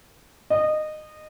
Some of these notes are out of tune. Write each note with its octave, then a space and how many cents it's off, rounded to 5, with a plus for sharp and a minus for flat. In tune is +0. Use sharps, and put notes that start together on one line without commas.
D#5 -20